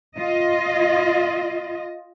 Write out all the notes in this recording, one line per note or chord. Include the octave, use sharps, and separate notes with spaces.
F4 D#5